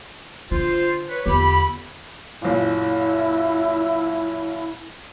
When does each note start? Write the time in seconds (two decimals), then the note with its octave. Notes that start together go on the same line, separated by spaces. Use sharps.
0.51 D3 F4 C5
1.09 B4 C#5
1.26 E2 D3 F4 G4 B5
2.42 F#1 A#2 E4